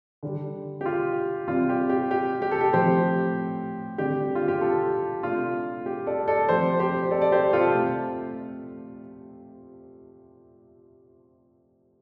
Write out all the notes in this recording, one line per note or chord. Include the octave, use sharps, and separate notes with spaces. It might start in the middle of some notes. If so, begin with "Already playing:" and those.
D3 G3 D4
G4
F4
C3 G3 C4 F4
G4
G4
G4
G4
A4
G4
A2 F3 A3 C4 G4 C5
D3 G3 C4 G4
F4
G4
F4 A4
C3 A3 D4 F4
G4
A4 D5
A4 D5
F3 A3 C4 G4 C5
G4 C5
A4 D5
D5
G4 C5
F4 A4
C3 A3 C4